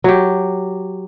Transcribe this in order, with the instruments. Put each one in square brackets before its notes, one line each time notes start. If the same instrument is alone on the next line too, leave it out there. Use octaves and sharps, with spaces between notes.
[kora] F#3 G4